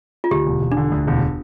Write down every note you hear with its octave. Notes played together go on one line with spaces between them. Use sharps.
F4
D2 G4
E1
E1
D4
D3
D2
E1